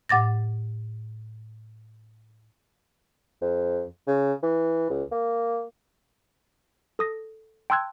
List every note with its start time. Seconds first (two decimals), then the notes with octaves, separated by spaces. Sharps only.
0.09 A2 F#5 D6 A6 A#6
3.42 F2
4.07 C#3
4.43 E3
4.90 C#2
5.12 A#3
6.99 A4 D#6 A#6
7.70 G5 A5 C6 E6 F#6 G#6